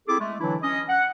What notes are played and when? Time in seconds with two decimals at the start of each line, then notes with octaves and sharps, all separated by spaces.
0.08 C4 E4 G#4 A4 D6
0.20 G#3 A3
0.40 D3 E3 F#3 D4 E4
0.63 C#4 D#5
0.89 F#5